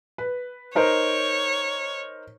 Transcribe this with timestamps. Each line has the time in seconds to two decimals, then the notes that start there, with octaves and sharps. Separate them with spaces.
0.18 B4
0.75 D#4 A#4 C5 C#5